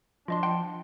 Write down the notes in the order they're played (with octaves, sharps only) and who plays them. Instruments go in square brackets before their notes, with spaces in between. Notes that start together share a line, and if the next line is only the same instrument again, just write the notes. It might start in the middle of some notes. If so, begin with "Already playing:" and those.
[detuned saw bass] F3 [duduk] D4 [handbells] F4 D#5 C6
[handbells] F#5 G5 C6